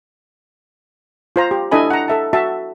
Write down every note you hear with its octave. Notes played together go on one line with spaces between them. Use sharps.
F4 C5 A#5
G4
D4 E4 A4 D#5 G#5 B5
F#5 A#5
A4 E5 A5
F#4 E5 A5